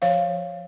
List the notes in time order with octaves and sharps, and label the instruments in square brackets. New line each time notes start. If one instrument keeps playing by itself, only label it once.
[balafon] F3 C#5 F5